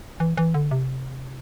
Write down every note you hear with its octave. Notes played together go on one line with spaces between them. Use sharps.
E3
E3
D3
C3